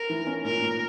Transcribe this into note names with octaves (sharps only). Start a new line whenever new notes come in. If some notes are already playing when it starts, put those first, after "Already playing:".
Already playing: A#4
E3
C#4
A#2 A#4
A#2